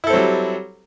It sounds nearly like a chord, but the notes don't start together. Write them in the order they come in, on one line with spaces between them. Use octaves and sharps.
E4 A4 C4 F#3 G3